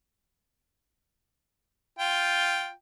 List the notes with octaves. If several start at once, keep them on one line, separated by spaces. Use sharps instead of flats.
F4 G5